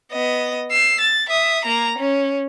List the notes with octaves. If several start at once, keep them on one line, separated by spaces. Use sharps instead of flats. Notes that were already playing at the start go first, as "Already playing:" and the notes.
B3 D#5
E6 C7
A6
E5 D#6
A#3 A#5
C#4